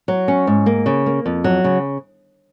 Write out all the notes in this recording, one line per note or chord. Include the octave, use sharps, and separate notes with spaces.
F#3
C#4
G#2
A#3
C#3
A#3
F2
F#3
C#3